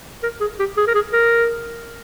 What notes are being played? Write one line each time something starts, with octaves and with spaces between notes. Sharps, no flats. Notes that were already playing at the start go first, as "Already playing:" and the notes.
A#4
G#4
G4
G#4
A#4
G#4
A#4